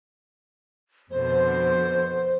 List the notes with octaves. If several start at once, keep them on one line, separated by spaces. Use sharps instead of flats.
F2 B2 D3 C5